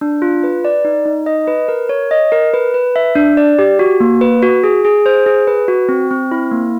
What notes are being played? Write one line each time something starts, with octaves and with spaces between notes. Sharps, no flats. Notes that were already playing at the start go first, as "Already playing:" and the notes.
D4
F4
B4
D5
D#4
D#4
D#5
B4
A#4
C#5
D#5
A#4
B4
B4
E5
D4
D5
G4
F#4
A#3
B4
F#4
G#4
G#4
C5
G#4
B4
F#4
C4
C4
E4
A#3